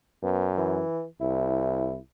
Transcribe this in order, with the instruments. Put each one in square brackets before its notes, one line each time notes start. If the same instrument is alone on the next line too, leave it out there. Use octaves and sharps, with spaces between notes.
[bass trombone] F#2 [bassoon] B3
[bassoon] E3
[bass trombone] C2 [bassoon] E4